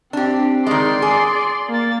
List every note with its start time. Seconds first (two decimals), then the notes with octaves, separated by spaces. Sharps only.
0.13 C4 D4 G4
0.67 D#3 G#3 D5 C6
1.02 G#4
1.69 A#3 A6